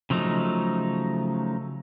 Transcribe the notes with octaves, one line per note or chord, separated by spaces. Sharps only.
C#3 F3 F#3 A3 D#4